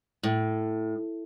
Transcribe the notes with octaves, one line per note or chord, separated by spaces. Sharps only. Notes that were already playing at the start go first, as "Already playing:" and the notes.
A2